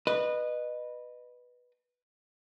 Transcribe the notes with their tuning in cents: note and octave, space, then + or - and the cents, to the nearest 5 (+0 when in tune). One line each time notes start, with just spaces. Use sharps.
B4 -5 D#5 -25